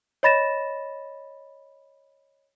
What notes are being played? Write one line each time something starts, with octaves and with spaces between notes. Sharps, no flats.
C#5 D#5 B5 A6 A#6 E7